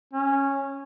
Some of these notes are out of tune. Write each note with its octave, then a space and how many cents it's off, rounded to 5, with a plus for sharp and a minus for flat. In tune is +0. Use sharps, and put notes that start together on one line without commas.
C#4 -10